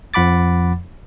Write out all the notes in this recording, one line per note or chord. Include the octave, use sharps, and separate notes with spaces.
F2 F3 F#5 B5 D6 A6